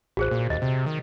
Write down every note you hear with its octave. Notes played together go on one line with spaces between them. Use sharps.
A1 F#4 G#4 C5
A#2
D#2 D#5
C3
D#3